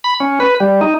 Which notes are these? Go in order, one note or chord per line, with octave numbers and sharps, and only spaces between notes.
B5
C#4
B4
G3
D#4